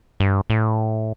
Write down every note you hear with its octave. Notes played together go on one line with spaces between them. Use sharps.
G2
A2